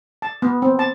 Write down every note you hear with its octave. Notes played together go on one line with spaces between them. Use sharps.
A5
B3
C4
A5